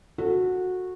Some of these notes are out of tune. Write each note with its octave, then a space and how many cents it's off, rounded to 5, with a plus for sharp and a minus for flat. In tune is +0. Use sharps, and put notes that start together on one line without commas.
F#4 -15 A4 +15